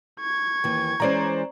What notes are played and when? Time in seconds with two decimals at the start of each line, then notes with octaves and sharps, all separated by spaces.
0.20 C#6 G#6
0.64 D#2 E3
1.00 E3 G#3 C#4 C5 D5 A#5